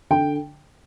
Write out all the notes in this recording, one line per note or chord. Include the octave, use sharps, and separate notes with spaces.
D3 G5